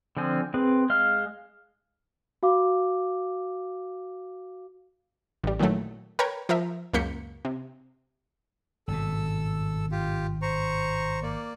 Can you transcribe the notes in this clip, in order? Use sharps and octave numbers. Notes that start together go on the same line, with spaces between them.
D3 F3 C4 G#5
C4 G#4 B4
G#3 D#5 F5 F6
F#4 F5 D6
A1 G3
A#2 D#3 E3 F#3 A3
A#4 B4 C#5 G5 A#5 G#6
F3 A#4 E5
C#2 F#2 A#3 G6 B6 C#7
C3
G#1 G2 B2 A4 E6
F4 G4
C5 A#5 C#6
A#3 D5